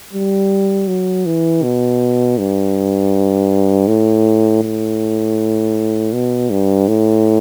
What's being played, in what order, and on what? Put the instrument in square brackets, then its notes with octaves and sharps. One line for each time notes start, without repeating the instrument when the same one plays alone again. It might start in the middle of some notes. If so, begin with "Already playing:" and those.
[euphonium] G3
F#3
E3
B2
G2
A2
A2
B2
G2
A2